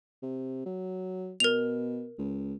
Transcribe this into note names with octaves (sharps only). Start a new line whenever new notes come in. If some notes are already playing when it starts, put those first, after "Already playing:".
C3
F#3
B2 A#4 F7
C#2